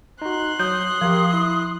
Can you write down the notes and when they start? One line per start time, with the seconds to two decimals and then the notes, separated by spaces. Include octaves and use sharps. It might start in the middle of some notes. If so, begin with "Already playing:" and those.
0.22 D#4 F#4 C6 F#6
0.59 F#3 D#6 G6
1.01 F3 G4 A#4 F5
1.33 E4